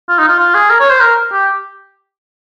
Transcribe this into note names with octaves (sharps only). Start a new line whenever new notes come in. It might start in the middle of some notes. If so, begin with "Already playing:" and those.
F4
D#4
F4
F4
G#4
A#4
C#5
C5
A#4
G4